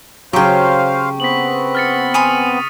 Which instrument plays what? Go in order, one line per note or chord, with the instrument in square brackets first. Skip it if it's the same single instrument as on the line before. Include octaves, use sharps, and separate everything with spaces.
[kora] C#3 F#3 [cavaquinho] G4 G5 [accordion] C5 F5 [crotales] C#6
[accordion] B3 C4 [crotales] B6 F#7
[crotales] F6 A6 C#7
[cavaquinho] G#5 B5 C6 [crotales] D#6 D#7